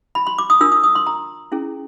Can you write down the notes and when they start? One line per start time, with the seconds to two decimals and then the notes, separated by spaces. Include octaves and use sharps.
0.15 B5
0.27 C6
0.38 D6
0.50 D#6
0.61 D4 F4 A#4 E6
0.72 D#6
0.83 D#6
0.95 C6
1.07 A#5
1.52 C#4 E4 G#4